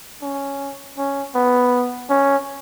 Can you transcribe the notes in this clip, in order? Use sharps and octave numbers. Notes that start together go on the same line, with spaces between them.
C#4
C#4
B3
C#4